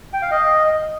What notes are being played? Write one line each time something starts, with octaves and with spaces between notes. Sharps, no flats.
G5
F5
D#5